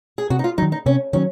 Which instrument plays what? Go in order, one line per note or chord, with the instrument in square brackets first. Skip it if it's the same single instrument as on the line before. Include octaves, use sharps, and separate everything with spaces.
[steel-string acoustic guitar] G#4
[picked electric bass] C3 [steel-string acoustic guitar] F#4
[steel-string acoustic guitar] D#4
F4
[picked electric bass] D#3 F#3 [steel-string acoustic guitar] D#4
[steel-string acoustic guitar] D#4
[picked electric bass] C3 [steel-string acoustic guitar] C#4
[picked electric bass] D#3 F#3 [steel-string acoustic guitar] C#4